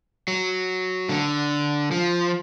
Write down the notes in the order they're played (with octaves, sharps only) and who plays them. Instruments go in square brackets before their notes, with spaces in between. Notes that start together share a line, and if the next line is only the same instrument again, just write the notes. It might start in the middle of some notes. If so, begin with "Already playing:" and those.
[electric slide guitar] F#3
D3
F3